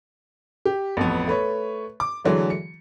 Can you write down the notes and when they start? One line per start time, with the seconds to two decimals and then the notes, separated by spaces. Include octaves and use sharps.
0.65 G4
0.97 A1 F2 B3
1.27 A3 B4 C#5
2.00 D6
2.24 D3 E3 F#3 G#3 A3
2.50 C#7